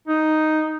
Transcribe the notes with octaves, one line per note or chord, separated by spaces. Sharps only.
D#4